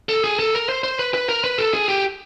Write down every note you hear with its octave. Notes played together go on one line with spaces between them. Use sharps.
A4
G#4
A4
A#4
C5
C5
B4
B4
A#4
B4
A4
G#4
G4